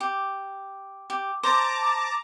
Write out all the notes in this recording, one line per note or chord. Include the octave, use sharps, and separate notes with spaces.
G4
G4
C5 A5 A#5 D6